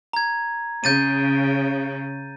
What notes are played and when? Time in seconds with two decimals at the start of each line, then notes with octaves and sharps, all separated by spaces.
0.13 A#5 G#6
0.84 C#3 G6 A6 D#7